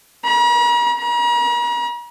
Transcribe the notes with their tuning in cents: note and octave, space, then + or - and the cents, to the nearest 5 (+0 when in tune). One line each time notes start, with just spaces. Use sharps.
A#5 +45
A#5 +45